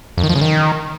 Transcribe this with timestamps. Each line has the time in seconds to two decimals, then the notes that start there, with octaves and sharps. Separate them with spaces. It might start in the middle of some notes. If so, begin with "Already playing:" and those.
0.18 F2
0.23 D#3
0.29 F3
0.35 C#3
0.41 D#3